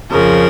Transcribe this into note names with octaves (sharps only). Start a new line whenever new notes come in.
F2 C#3 F3 A#4